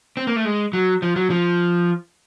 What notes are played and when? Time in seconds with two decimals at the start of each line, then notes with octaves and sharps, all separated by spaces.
0.17 C4
0.27 A#3
0.36 A3
0.45 G#3
0.73 F#3
1.02 F3
1.16 F#3
1.30 F3